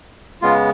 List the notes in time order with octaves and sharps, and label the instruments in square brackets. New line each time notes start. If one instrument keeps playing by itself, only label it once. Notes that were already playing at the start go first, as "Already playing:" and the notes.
[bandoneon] C#3 G#3 B3 F4